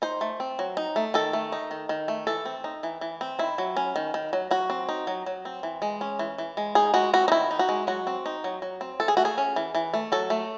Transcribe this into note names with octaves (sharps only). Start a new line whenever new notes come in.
D#4 C5
A3
C4
F#3
D#4
A3
D#3 A4
A3
D#4
D#3
D#3
A3
E3 A4
C4
D#4
E3
E3
C4
D#3 E4
F#3
C#4
D#3
D#3
F#3
F#3 F#4
C4
D#4
F#3
F#3
C4
E3
G#3
C#4
E3
E3
G#3
D#4 G#4
G#3 F#4
C4 F#4
D#4
D#3 E4
D#4
F#4
G#3
F#3 F#4
C4
D#4
F#3
F#3
C4
E3 A4
G#4
A3 F#4
G#4
C#4
E3
E3
A3
F#3 A4
A3